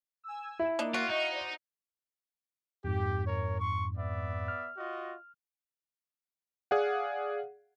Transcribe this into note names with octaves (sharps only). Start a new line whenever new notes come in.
G#5 E6
E4
A#3 D4 D#4 D5
F4 F#4
D#4 D#5 F5 C#6
C5 D5
F2 G#2 G4
A#4 C#5
C6 C#6
B3 D5 E5
F6
F4 F#4 D#5
G#4 D5 F5 F#5